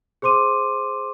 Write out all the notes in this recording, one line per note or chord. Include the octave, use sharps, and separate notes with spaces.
G#4 C5 C6 D6 D#7